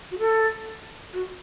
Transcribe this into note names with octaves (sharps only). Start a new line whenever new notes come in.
F#4
A4
F#4